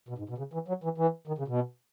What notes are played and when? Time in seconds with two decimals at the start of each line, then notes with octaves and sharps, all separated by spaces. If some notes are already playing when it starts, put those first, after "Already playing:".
0.09 B2
0.18 G#2
0.29 B2
0.38 C#3
0.53 E3
0.68 F#3
0.84 E3
0.98 E3
1.28 D#3
1.38 C#3
1.48 B2